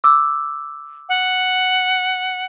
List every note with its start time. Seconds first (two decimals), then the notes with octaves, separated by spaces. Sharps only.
0.04 D6 E6
1.09 F#5